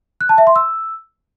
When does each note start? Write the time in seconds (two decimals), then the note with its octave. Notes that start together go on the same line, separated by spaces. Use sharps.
0.21 F#6
0.29 A5
0.38 E5
0.47 C6
0.56 E6